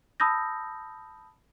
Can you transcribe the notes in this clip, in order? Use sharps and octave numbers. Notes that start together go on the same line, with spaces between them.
A5 B5 D#6 E6 G6 A#6